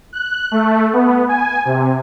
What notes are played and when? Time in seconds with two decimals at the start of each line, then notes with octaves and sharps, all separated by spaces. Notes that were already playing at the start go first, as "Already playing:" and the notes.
0.13 F#6
0.51 A3
0.93 B3
1.28 G#5
1.65 C3